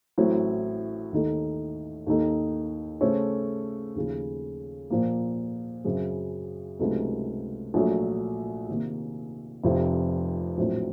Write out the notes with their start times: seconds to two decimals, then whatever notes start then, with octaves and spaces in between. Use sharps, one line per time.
0.18 A1 A2 F#3 C4
1.13 D#2 D#3 A3 D#4 A4
2.07 D#2 D#3 A#3 D#4 A4
3.01 C#3 A3 C#4 A4 C5
3.95 D#2 C#3 F3
4.90 A#2 F3 A#3
5.85 F#2 C#3 F#3 C4
6.79 C#2 C3 F#3 A3 D#4
7.74 A#1 A#2 F#3 A3
8.68 C3 D#3 A#3
9.64 F1 F2 C3 F3
10.58 A#1 A2 F#3 C4